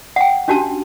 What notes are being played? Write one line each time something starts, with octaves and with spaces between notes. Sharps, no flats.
F#5 G5
C#4 D4 F#4 G4 A5